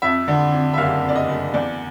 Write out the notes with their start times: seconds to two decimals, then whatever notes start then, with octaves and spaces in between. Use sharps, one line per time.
0.02 F2 E5
0.28 D3
0.52 F2
0.74 E5
0.78 F#1 F5
1.03 F2
1.09 D5
1.16 D#5
1.28 F#1
1.54 E2 D5